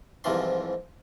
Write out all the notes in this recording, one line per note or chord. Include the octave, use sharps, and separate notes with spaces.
C2 G#2 C3 E3 F3 C6